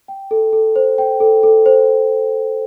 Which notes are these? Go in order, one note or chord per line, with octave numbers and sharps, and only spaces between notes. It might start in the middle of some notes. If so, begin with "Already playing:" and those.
G5
A4
A4
C5
G5
A4
A4
C5